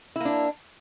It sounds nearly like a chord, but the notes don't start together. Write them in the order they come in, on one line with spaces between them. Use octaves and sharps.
E4 A#3 D4